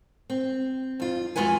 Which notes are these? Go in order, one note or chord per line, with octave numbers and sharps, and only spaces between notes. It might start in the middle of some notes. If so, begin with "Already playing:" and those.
C4
F2 F4
F2 G#3 F4 F#4 B4 G#5